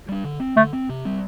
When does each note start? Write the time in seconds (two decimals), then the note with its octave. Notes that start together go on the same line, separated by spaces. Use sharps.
0.08 G3 D4
0.24 D3
0.40 C4
0.57 D3 A3
0.73 C4
0.89 C3
1.05 G3 C4